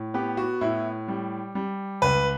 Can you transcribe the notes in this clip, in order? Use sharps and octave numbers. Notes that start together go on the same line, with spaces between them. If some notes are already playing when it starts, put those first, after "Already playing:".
Already playing: A2
B3 G4
F#4
A2 E4
G3
G3
C#2 B4